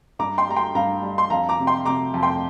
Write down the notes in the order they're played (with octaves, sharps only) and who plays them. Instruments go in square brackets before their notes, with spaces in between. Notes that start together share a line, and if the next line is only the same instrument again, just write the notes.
[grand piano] G2 A#5 D6
G5 C6
G3 A#5
G5 C6
G2 F5 A#5
G3
C6
F2 F5 A#5
A#5 D6
C3
G5 C6
C3 A#5 D6
F2
G5 C6